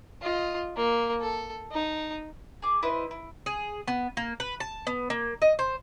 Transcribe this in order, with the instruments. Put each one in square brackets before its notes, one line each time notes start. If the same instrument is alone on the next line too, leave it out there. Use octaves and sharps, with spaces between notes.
[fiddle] F4 D#5
A#3
A4
D#4
[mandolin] G#4 D6
E4 B4 C5 D#5
E4
[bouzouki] G#4
B3
A#3
B4
A5
B3
A#3
D#5
C5